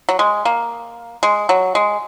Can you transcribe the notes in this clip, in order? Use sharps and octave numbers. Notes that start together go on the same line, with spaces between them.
F#3
G#3
A#3
G#3
F#3
G#3